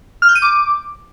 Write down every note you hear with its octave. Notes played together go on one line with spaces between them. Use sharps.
F6
G6
D#7
D6